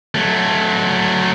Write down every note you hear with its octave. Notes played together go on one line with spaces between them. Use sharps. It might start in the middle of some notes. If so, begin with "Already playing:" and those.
F#3 A3